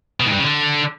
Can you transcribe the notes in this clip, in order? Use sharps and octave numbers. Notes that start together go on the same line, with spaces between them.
B2
G#2
G2
C#3
D3